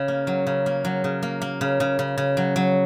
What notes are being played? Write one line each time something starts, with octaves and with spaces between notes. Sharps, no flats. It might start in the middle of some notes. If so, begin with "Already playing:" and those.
Already playing: C#3
A#3
F#3
C#3
A#3
F#3
C#3
A#3
A#3
C#3
C#3
C#3
C#3
F#3
F#3